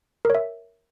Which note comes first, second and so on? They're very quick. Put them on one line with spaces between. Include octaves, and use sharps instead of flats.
A#4 C#5 E5